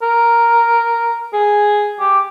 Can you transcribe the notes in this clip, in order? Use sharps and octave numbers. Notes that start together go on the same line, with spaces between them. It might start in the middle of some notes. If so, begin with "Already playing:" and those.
A#4
G#4
G4